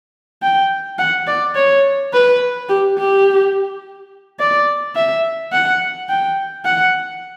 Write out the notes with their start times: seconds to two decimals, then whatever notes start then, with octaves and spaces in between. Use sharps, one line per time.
0.43 G5
0.99 F#5
1.27 D5
1.55 C#5
2.13 B4
2.69 G4
2.98 G4
4.39 D5
4.96 E5
5.52 F#5
6.09 G5
6.65 F#5